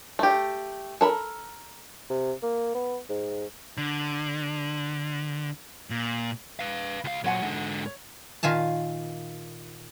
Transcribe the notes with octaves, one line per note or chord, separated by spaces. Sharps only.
A3 G4
A4 A#4 B5
C3
A#3
B3
G#2
D3
A#2
B4 F5
C#2 F5
A#2 F#3 C5 F#5 G#5
G#2 D3
C#5
A#2 D#3 F4 G#5 A5